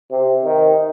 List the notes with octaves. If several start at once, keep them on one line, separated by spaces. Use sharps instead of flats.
C3
D#3